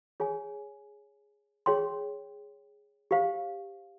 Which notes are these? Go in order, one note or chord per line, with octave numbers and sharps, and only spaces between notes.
G#4 C#5 G#5
G#4 C#5 G5 C6
G4 C5 F5